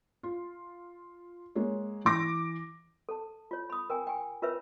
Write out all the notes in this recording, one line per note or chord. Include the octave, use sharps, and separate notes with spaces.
F4
G#3 A#3 C#5
E3 D6 A#6
A4 A5
F4 C#5
B5 D#6
A#4 G5 G#5
G5 G#5
F4 A#4 B4 C#5 E5